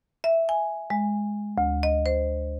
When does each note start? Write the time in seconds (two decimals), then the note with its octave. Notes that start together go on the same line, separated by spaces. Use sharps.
0.24 E5
0.49 G#5
0.90 G#3
1.58 D2
1.83 D#5
2.06 C5